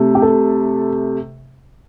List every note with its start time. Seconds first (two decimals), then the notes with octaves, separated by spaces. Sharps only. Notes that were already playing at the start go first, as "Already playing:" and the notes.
Already playing: C3 A3
0.15 G4
0.22 A4